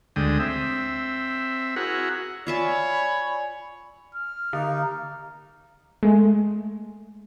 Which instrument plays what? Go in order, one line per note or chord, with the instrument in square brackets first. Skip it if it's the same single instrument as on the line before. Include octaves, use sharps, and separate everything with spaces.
[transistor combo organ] D2 D3 G#3 G5 D#6
C4 E5
E4 F#4 G#4 A#4 F#5
[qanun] F4 E5 A5 [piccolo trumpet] C#5 [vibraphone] D5 G#5 [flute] B5
[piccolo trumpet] F6
[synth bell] D3 [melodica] A#3 D#4
[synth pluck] G#3 A3